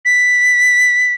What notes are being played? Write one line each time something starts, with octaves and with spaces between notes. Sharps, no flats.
B6